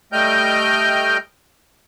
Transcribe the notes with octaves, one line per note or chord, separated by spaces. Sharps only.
G3 A3 D#5 G5 F6 G6